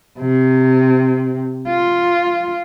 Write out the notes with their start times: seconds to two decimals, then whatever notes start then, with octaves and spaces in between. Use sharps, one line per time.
0.20 C3
1.69 F4